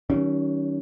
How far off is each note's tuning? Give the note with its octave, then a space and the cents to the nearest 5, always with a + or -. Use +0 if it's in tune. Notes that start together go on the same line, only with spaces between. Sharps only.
D#3 +15 G3 -45 C#4 +15